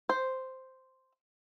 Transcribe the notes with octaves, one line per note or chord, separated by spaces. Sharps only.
C5